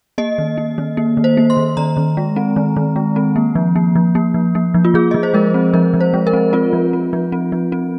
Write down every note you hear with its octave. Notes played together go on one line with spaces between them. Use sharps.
A#3 D#5
D#3
A#3
D#3
A#3
D#3
C5
A#3
C6
D#3
D#3 A#5
D#3
G#3
C4
D#3
D#3
G#3
C4
A#3
F3
A#3
F3
A#3
F3
A#3
F3
F4
F3 G#4
F3 D#5
C5
G#3 A#4
C4
F3 A#4
F3
C5
G#3
A#4
C4
C4 F4
F3
C4
F3
C4
F3
C4